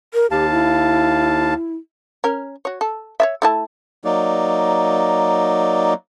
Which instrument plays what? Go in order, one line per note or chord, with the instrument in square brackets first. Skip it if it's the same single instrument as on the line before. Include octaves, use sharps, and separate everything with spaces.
[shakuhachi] A#4
[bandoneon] D#2 F5 A5 [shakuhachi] G4
[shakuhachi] E4
[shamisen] C#4 A#4
F#4 C#5
A4
C#5 D5 E5
A3 E4 A5
[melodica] F#3 A#3 D#4 D5